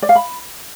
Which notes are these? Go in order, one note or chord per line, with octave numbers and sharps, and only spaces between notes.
D5
F5
B5